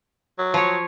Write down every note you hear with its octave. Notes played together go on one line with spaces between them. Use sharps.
F#3
F3 C#5